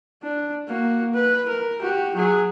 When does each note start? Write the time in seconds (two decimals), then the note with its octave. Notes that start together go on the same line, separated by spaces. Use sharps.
0.24 D4
0.68 A#3 F#4
1.14 B4
1.49 A#4
1.82 F#4 G4
2.16 F#3 G#4